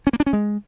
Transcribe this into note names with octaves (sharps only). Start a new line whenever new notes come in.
C#4
A#3
D4
C#4
G#3